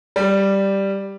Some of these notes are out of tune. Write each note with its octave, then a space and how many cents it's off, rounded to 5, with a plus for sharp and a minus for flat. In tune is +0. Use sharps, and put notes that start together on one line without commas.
G3 +0